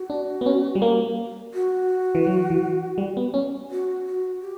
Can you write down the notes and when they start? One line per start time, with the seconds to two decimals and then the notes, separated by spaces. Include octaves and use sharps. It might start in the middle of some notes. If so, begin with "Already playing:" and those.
Already playing: F#4
0.10 D4
0.41 B3
0.46 C#4
0.75 G3
0.82 A#3
1.54 F#4
2.15 E3
2.27 F#3
2.50 E3
2.98 G3
3.17 B3
3.34 C#4
3.71 F#4
4.06 F#4
4.42 G4